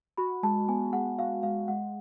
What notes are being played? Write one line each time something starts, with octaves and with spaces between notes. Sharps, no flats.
F#4 B5
G#3 A5
B3 G#5
G#3 F#5
F#4 F5
G#3 F5
G#3 F#5